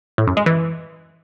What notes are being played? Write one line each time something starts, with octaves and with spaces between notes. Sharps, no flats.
A2
F#2
G#3
E3